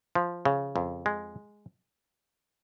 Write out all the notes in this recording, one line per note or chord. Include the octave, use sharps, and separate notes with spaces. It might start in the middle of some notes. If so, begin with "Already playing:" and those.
F3
C#3
F2
G#3